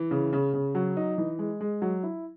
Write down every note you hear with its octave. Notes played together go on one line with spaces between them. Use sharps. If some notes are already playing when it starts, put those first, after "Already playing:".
Already playing: E3
C#3
C#3
C#3
F#3
D#4
E3
G#3
G#3
F#3
E4